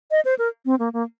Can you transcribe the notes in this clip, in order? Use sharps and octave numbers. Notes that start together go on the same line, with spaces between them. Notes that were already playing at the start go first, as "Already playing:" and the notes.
D#5
C5
A#4
C4
A#3
A#3